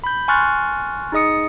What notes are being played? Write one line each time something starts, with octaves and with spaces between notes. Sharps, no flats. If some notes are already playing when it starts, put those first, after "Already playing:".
B5 G6
G#5 C6 C#6 F6 F#6 A6
D#4 G#4 D#5 D#6 C#7